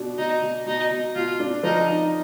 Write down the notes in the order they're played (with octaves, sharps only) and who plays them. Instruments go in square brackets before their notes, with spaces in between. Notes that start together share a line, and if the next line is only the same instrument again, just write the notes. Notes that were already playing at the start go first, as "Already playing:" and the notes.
Already playing: [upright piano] B2 D4
[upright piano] B2 [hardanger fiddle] D#4
[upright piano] B2
[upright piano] B2 [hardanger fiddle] D#4
[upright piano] B2
[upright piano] B2 [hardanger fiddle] F4
[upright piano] D4
[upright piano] F3 [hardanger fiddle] D#4
[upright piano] D#4